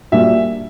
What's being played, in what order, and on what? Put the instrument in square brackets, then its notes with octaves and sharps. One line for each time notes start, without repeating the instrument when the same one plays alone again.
[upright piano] A#2 G3 A#3 D4 F#4 [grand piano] E5